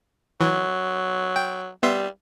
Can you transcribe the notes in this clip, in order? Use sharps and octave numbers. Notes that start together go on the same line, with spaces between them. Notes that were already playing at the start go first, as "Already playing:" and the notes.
E3 F#3
G5
G3 B3 E5 C6